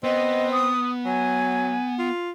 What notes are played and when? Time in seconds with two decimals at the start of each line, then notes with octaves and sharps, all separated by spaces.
0.04 B3 C4 D#5
0.52 D#6
1.05 F#3 G#5
1.99 F4